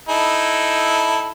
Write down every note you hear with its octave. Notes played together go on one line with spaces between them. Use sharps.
D#4 E4 A4